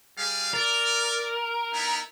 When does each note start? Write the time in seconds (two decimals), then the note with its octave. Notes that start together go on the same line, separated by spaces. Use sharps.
0.18 G3 G#4 F5
0.54 A#4 D5
1.73 B3 D#4 E4